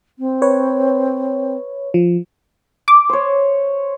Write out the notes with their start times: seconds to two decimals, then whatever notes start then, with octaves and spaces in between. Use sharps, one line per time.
0.19 C4
0.42 B4 C#5
1.94 F3
2.88 D6
3.09 C5 C#5